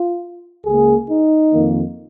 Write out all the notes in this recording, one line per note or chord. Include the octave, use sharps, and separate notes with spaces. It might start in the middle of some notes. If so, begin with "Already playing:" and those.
Already playing: F4
C#2 C#3 A#3 G#4
D#4
F2 D#3 A#3